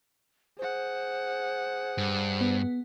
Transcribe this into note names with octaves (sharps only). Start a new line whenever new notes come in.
G#4 C5 F#5
G2
B3